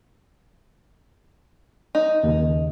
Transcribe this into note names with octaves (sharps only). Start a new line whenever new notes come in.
D#4
D#2 C#3